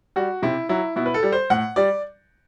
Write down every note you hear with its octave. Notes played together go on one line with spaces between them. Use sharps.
G3 F#4
C3 E4
F#3 E4
B2 E4
B4
A4
G3
C5
A2 F#5
G3 D5